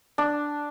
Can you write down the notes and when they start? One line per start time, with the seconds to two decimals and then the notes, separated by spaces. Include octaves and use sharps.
0.18 D4